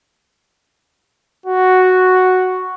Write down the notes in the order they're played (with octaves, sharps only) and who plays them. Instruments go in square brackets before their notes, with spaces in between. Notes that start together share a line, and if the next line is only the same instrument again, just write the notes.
[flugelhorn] F#4